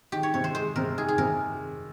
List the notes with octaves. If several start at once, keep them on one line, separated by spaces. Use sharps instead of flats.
D#3 G4
C#5
C3 C#5
C5
G#3 C5
C3 A#4
D#3 G#4
G#4
C3 A#4